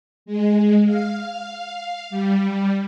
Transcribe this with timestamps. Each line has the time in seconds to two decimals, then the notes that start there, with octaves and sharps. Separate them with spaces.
0.26 G#3
0.86 F5
2.10 G3